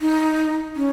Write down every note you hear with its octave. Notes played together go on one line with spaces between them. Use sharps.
D#4
C#4